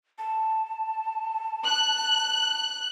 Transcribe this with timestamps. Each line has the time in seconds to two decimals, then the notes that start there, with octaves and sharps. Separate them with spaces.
0.19 A5
1.66 F#6